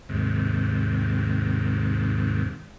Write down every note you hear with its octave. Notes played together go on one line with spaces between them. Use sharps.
D#2 G#2 C3